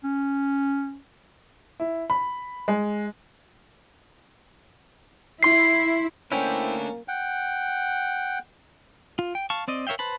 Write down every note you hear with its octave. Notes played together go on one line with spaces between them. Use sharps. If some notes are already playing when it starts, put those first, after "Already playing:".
C#4
E4
B5
G#3
E4 C6 C7
A3 A#3 C#4 D4 E4 C5 G5
F#5 G5
F4
G5
F5 A5 C#6
C4 D5 D#5
A#4 C#5 E5 F5 G5
B4 C5 A5 B5